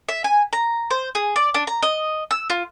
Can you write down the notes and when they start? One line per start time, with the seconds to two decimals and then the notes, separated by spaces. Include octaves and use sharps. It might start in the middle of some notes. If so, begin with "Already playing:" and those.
0.09 E5
0.24 G#5
0.53 A#5
0.91 C5
1.15 G#4
1.36 D5
1.54 D4
1.67 A#5
1.83 D#5
2.31 E6
2.50 F4